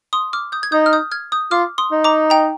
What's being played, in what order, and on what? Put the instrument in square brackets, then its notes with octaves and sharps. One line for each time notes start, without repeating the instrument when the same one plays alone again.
[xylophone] C6 D#6
D6 F6
D#6 G6
G#6
[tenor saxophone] D#4 [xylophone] D#6 G6
[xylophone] F6
D#6 G6
F6 G#6
D#6 G6
[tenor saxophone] F4 [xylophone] D6 F6
[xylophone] C6 D#6
[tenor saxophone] D#4
[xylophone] A#5 D6
G5 A#5